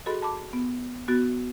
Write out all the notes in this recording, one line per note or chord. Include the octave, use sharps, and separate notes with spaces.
F#4 G#4 A4 D#5 B5 C6
A5 B5 D6
B3
B3 F#4 A6